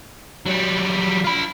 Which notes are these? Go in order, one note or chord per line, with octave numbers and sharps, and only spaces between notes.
F#3 G3
F4 B5